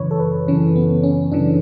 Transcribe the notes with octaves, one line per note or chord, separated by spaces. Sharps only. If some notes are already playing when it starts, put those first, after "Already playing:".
Already playing: F#2 C#3 E3 B4 C#5
A4
B4
F#2 C#3 E3 C#4
B3
C#4
F#2 C#3 E3 D4